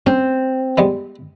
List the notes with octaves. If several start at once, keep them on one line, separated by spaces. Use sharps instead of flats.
C4 C#4
G3 G#3 B3